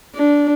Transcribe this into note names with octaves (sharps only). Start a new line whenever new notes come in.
D4